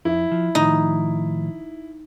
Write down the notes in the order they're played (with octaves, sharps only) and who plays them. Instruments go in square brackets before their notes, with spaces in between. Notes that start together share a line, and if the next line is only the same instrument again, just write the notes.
[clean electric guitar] F2 [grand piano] E4
[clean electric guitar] F3
[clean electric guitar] A2 D#3 F3 [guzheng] D#4